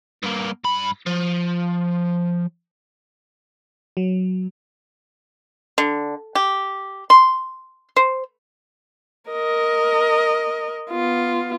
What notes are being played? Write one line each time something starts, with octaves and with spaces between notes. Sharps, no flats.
G2 A#3
G2 B5
F3
F#3
D3
G4
C6
C5
A#4 D#5
B3 F4